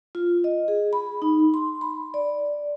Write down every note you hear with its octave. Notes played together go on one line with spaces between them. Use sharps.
F4
D#5
G#4
B5
D#4
C6
B5
D5